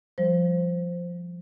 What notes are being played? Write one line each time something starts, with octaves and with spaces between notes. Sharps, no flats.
F3 G3 C5